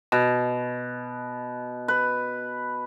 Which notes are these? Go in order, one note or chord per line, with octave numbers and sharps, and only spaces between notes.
B2
B4